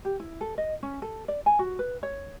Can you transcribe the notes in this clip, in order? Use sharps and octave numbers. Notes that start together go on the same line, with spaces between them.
G4
E4
A4
D#5
C#4
A4
D5
G#5
F#4
B4
C#5